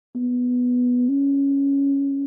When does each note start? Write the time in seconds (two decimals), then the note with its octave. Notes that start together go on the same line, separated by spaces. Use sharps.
0.15 B3
1.09 C#4